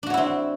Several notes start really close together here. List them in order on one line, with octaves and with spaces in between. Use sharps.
D4 F#4 C#5 E4 C4